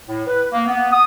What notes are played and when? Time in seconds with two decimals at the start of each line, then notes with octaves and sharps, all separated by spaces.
0.07 A2
0.26 B4
0.52 A#3
0.66 B3
0.91 D#6